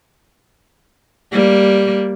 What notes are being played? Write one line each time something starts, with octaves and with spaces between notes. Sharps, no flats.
G3 A#3